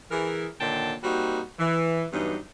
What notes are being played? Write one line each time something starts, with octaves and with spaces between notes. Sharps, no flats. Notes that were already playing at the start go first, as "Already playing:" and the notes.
E3 G#4 A#4
A#2 D3 D#3 C#5 G5 A5
G3 A#3 C4 D#4 F#4
E3
G2 E3 F#3 G3 B3 D#4